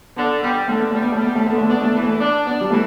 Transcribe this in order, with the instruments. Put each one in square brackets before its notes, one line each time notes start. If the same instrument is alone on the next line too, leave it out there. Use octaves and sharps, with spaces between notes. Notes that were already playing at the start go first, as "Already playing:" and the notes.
[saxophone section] D3 [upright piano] B3
[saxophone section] G3 [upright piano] B3
[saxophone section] D3 [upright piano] A3
[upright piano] B3
[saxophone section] G3 [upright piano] A3
[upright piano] B3
A3
[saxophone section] G3
[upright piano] B3
A3
[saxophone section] D3 [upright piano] B3
[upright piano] A3
[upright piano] B3 [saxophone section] D4
[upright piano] A3
[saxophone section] E3 [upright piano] B3
[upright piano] A3
[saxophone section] D4
[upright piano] B3 [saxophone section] D4
[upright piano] G3
[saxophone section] E3 [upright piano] A3